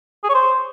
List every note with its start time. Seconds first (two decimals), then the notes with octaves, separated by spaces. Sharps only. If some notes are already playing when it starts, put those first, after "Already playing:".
0.24 G#4
0.29 C#5
0.35 C5